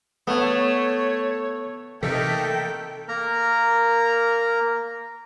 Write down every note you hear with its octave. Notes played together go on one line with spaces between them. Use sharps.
A3 B3 C#5
C3 E3 A3 A#3 D#4 A4 G5 B6
A#3 A#4 A#5